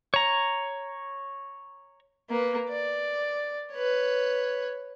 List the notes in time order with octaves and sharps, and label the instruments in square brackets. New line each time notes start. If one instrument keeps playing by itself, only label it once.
[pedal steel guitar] C#5 A#5
[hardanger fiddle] A#3 B4
D5
B4 C#5